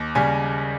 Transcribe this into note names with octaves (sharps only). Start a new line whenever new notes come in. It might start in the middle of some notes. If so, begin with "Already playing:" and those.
Already playing: D#2
C#3 G3 G#5